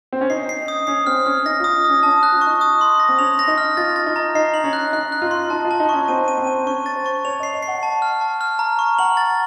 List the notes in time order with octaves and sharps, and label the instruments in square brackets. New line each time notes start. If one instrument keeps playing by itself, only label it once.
[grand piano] C4
C#4
[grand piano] D#4 [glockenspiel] C7
[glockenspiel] C7
D#6
[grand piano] C#4 [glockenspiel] C7
[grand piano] C4 [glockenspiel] F6
[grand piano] C#4 [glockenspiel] F6
[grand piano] D#4 [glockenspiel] A#6
[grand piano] F4 [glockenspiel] D#6
[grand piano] C#4 [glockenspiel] D#6
[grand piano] C#4 [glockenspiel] A5
[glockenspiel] F#6
[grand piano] F4
[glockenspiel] C#6
[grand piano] D#4
[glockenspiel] D#6
C6
A#6
[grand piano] C4
[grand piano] C#4 [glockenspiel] F7
[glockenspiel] A#6
[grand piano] D#4
[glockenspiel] F6
[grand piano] F4 [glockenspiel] A6
[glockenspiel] A6
[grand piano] D#4
[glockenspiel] A#5
[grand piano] D#4 [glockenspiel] C7
[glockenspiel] F#7
[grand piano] C#4
[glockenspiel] F#6
[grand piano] D#4 [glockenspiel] F#6
[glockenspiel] F#6
[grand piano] F4
[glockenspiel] C6
[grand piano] D#4 [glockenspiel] A5
[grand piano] F4
[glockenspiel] A5
[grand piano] D#4
[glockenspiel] C#6
[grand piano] C#4
[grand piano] C4 [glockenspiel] D#7
[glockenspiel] D#7
[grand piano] C4
[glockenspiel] D#7
[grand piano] C#4 [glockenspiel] C#6
[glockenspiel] A6
[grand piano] C5
[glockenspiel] C#6
[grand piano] C#5 [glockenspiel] F7
[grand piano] D#5 [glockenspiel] C7
[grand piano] D#5
[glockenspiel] C7
[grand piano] F#5
[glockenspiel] A5
F6
A5
F6
A#5
C#6
[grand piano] F#5 [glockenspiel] F#7
[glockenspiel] A6